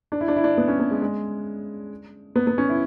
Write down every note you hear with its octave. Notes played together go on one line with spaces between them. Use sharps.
D4
E4
D4
E4
D4
B3
C#4
B3
G#3
G#3
B3
B3
C#4
E4